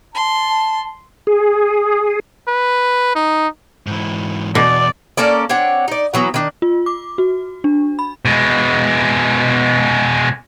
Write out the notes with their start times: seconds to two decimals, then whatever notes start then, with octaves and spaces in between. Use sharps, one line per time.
0.15 A5 C6
1.27 G#4
2.48 B4
3.15 D#4
3.87 G#2 E3
4.55 E2 B2 D5
5.17 A#3 C#4 A4 D5
5.49 C4 D4 C#5 F#5
5.88 D#4 D5
6.14 E3 F#3 B3
6.34 D#3 D4
6.62 F4
6.86 D6
7.18 F#4
7.64 D4
7.99 B5
8.25 B2 G#3